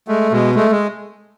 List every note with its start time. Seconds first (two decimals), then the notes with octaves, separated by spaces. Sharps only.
0.08 G#3 A3
0.32 B2 G#3
0.55 G#3 A3
0.71 G#3